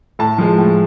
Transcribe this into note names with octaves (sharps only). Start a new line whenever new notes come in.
A2 A5
F3 G#3
A2